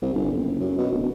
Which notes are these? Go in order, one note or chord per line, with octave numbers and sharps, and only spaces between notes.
C2
G1
F#1
F#2
B2
D1